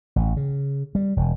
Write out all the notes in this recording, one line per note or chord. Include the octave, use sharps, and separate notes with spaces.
A1
C#3
G3
E1